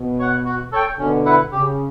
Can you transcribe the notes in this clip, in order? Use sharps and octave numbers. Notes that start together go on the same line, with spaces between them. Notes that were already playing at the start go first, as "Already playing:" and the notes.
Already playing: B2
C#5 F#5
F#4
A4 C#5 G5
B2 D3 C#4
E4 B4 F#5
C#3 G4